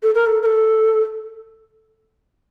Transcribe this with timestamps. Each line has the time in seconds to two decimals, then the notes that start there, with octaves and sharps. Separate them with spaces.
0.03 A4
0.15 A#4
0.26 A4
0.42 A#4
0.46 A4